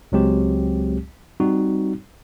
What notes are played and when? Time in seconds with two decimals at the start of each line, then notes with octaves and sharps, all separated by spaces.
0.12 C#2 F#3 G#3 C4 G4
1.40 G3 C4 D#4 F#4